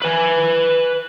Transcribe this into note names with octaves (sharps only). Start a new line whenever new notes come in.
B4 G#5